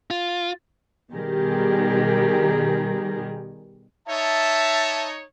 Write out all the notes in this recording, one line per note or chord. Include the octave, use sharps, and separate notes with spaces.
F4
B2 D#3 G3 G4 G#4 A#4
D#4 C#5 E5 A5